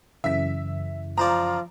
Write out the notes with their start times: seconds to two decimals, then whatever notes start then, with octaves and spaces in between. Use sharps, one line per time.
0.24 F#2 C#3 E3 E5 B6
1.18 F3 F4 C5 D5 A#5